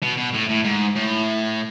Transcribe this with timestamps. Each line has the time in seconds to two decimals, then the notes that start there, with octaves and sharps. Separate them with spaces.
0.03 B2
0.18 B2
0.35 A2
0.50 A2
0.64 G#2
0.95 A2